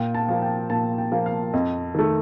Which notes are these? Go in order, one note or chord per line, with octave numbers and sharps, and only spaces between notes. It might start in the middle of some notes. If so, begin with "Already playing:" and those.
Already playing: A#2 G5
A5
F3 A#3
G5
A#2 A5
G5
F3 A#3
F5
F2 D#5
D#3 A3